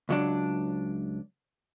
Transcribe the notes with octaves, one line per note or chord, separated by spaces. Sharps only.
C#2 F#3 D4